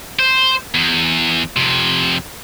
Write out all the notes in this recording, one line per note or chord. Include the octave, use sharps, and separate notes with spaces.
C5
E2
F2 C3